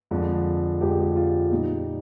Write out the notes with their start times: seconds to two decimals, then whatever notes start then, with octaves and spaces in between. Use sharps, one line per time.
0.11 F2 D3 F3 G#3
0.81 F2 D3 F3 G#3 G4
0.90 G#4
1.00 G4
1.16 F4
1.51 A#2 G3 D#4